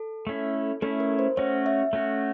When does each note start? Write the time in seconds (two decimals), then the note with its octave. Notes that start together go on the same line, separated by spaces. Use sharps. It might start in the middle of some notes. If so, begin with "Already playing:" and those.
Already playing: A4
0.27 A3 C#4 E4
0.82 A3 C#4 E4 A4
1.00 A#4
1.19 C5
1.37 A3 C#4 F#4 C#5
1.66 E5
1.93 A3 C#4 F#4